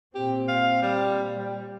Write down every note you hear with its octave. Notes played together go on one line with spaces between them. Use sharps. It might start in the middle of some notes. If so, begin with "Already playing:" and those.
A#2 C4 G4
F5
G3
G3